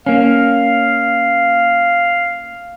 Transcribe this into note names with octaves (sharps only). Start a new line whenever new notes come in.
A#3 C#4 F5